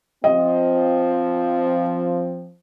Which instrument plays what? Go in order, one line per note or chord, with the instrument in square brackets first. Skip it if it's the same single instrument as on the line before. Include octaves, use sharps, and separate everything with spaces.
[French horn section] F3 C4 [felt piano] D#5